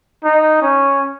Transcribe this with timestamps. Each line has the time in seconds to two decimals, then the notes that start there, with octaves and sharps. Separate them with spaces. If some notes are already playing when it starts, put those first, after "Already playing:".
0.24 D#4
0.62 C#4